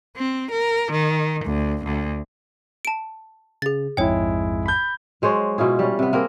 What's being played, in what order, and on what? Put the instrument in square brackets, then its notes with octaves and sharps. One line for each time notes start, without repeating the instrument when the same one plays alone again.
[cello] C4
A#4
D#3
D2
D2
[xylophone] A5 D7
[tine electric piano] C#3 [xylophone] G#4 A6
[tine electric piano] A#1 F2 G#2 [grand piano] G#3 E4 [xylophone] C#5 G5
[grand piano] B5 G6
[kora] F#3 G#3 C5 C#5
B2 E4 F4 G#4
G3 C#4
C3 B3
A#3 C4 G#4 A#4